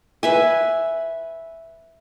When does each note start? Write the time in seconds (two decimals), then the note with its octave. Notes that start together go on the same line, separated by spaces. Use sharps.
0.23 B4 E5 G#5